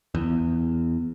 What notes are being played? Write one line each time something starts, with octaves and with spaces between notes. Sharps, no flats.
E2